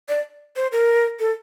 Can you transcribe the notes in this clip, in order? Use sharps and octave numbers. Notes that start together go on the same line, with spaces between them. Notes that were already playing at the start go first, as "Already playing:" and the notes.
D5
C5
A#4
A4